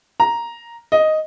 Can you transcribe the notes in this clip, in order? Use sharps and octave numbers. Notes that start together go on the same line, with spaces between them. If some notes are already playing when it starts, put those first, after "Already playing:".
A#5
D#5